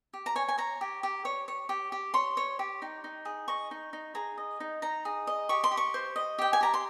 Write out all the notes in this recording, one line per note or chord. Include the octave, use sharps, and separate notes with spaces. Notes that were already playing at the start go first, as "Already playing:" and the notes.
G4
A#5
C#5 G#5
G#5
C#5 A#5
G4
G4
C#5
C#5
G4
G4
C#5 C6
C#5
G4
D#4
D#4
G#4
D#5 C#6
D#4
D#4
G#4 A#5
D#5
D#4
D#4 A#5
G#4
D#5
G4 C#6
C6
G4
C#6
C5
D#5
G4 G5
G#5
G4 A#5
C6